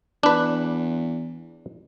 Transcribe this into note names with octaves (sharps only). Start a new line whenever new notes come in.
E2 D4 B4